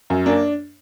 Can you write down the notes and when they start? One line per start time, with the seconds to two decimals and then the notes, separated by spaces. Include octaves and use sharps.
0.10 F#2
0.26 A#3 D4